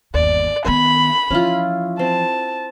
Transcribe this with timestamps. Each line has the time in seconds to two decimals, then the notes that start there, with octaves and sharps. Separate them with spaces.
0.14 G1 D#2 D5
0.66 D#3 B3 G#5 B5
1.31 E3 F3 C#4 E4 F4
1.99 C4 A5